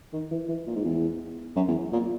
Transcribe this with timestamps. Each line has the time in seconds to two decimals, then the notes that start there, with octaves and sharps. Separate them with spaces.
0.13 D#3
0.31 E3
0.48 E3
0.67 A#2
0.76 G#2
0.85 E2
1.56 F#2
1.68 E2
1.93 A#2